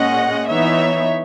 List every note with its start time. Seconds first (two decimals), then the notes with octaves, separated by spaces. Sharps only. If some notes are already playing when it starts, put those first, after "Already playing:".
Already playing: A#2 G#3 C#4 D#5 F#5
0.48 E3 B3 D#4 C#5 E5